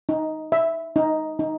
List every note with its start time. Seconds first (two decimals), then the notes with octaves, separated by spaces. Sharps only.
0.09 D#4
0.52 E5
0.96 D#4
1.39 D#4